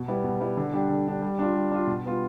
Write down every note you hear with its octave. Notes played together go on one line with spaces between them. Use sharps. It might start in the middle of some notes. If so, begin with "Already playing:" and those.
Already playing: B2
G3 B3 E4
B2
G3 B3 E4
D3
G3 D4 G4
D3
G3 D4 G4
G3
D4 F4
G3
D4 F4
B2
G3 B3 F4